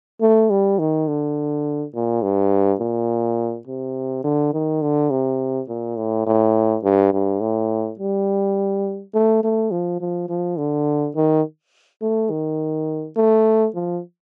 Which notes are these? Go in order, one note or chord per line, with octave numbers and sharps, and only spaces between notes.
A3
G3
D#3
D3
A#2
G2
A#2
C3
D3
D#3
D3
C3
A#2
A2
A2
G2
G2
A2
G3
A3
A3
F3
F3
F3
D3
D#3
A3
D#3
A3
F3